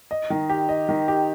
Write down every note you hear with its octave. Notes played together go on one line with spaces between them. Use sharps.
D#5
D#3
G4
D#5
D#3
G4